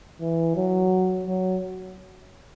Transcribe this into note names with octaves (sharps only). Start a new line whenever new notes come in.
E3
F#3
F#3